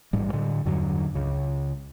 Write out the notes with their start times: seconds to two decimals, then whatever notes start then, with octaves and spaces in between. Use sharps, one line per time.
0.13 A1 G#2 G3
0.33 A2 D3
0.65 E2 G2 D3 F#3
1.14 C#2 C#3